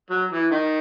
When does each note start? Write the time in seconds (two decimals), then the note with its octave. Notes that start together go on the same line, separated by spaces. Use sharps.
0.10 F#3
0.31 E3
0.51 D#3